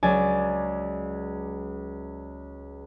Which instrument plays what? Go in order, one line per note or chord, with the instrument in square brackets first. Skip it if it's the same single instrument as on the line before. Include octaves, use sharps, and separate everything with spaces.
[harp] C#2 F#3 D5 G#5